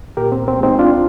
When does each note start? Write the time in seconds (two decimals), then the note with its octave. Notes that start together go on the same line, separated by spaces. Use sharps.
0.17 A#2 G4 A#4
0.32 C4
0.38 C2
0.48 C4
0.58 G#3
0.63 C4 D#4
0.78 C2 D4 F4